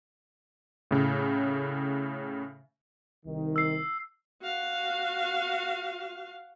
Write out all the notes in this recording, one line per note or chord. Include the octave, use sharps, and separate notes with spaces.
A2 C#3
C2 D#3
E6 C7
F#4 F5